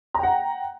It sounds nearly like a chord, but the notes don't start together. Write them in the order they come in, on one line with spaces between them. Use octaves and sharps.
A#5 G5 F#5